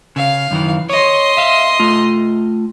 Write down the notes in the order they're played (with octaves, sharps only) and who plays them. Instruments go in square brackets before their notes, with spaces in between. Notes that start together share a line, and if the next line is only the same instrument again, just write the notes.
[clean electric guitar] C#3 [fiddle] F5
[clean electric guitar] F#2 D#3 E3
[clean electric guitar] C#5 [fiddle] D#5 C6
[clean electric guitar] E5 F5
A3 F4